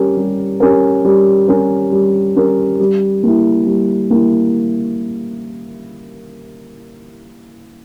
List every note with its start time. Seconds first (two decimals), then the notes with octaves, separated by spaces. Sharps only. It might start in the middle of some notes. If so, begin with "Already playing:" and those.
Already playing: G3 C#4 G4 A#4
0.17 G3
0.60 C#4 G4 A#4
1.04 G3
1.48 C#4 G4 A#4
1.92 G3
2.36 C#4 G4 A#4
2.80 G3
3.23 A#3 E4
3.66 G3
4.10 A#3 E4